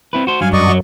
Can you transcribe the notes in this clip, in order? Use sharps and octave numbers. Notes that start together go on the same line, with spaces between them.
C4 E4 B4
F#4 C5
G2 F#3 F5 G#5
F#2 D5 D#5 C#6
F#3